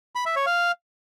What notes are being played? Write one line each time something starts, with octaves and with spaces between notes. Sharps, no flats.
B5
E5
C#5
F5